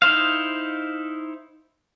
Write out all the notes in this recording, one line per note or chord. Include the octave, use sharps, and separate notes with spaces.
D#4 E4 C5 F5